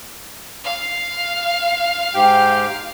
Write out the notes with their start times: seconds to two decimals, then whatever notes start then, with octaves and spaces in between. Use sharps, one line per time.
0.64 F5
2.14 G#2 G4 G5